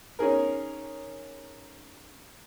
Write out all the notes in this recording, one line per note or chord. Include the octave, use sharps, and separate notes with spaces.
C#4 D#4 G#4 A#4